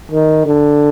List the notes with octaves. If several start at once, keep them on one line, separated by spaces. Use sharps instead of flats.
D#3
D3